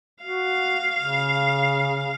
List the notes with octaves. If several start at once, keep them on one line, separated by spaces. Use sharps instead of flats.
F#4 F5
C#3